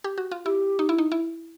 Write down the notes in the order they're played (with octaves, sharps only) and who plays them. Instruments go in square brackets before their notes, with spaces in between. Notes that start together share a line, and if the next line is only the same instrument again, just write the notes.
[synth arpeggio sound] G4
F#4
F4
[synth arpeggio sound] E4 [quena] G4
[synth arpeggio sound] D#4
E4
D#4
E4